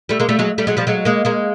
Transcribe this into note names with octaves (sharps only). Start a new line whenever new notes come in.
G3 A3
G#3 A#3
G3 A3
F#3 G#3
G3 A3
F#3 G#3
F3 G3
F#3 G#3
G#3 A#3
G#3 A#3